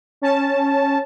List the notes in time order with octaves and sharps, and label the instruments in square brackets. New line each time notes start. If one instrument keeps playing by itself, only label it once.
[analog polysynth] C#4 A5